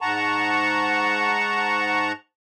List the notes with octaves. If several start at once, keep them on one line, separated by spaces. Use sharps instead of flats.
G#2 F#5 A5 A#5 C#6